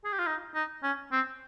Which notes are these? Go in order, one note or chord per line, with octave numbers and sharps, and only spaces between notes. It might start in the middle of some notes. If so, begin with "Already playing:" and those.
G#4
G4
F4
D#4
D#4
C#4
C4